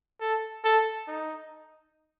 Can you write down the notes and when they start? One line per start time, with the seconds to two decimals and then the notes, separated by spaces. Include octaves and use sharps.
0.21 A4
0.64 A4
1.08 D#4